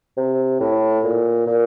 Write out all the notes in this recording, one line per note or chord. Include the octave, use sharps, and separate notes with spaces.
C3
A2
A#2
A#2